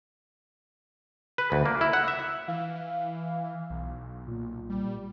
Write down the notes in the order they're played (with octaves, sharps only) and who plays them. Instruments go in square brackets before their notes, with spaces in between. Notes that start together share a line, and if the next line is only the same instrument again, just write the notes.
[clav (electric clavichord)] B4
D2
A#3
E4
F#5
E5
[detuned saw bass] E3 [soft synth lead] F5
[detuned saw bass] B1
[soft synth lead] A#2
[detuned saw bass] G3